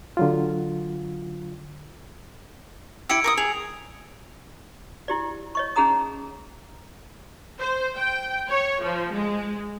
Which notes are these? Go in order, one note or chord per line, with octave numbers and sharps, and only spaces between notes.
D3 F#3 F4
E4 G4 E6 C#7 D7
A#4 C#6 D#6
G#4 F7
E4 G4 D5
C#5 D#5 C#6
C#4 D#4 G#4 F#5 A#5 D#6
C5
G5
C#5
F3
G#3